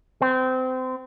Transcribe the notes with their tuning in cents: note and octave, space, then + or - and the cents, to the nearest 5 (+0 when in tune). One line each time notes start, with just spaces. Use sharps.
C4 -25